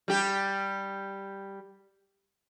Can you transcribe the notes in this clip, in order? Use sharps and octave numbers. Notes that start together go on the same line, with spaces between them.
G3 G4